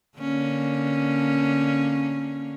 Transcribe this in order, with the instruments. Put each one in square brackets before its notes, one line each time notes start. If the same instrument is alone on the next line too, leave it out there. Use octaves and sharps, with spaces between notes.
[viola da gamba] D3 A#3 C#4